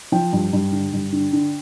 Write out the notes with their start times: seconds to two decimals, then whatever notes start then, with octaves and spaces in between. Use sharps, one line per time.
0.12 F3 G5
0.33 G2
0.53 G2
0.72 D3
0.93 G2
1.12 D3
1.33 D3